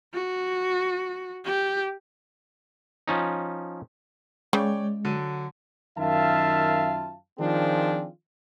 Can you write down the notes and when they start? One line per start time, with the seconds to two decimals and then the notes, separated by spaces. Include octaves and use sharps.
0.13 F#4
1.45 G4
3.08 F3 C#4 D#4
4.53 C#3 G#3 C#5 D5 G5
5.05 D3 F#3 D#7
5.98 F#2 D#3 F4 E5 F5 A5
7.39 D#3 F3 C4 D4 F4 G#4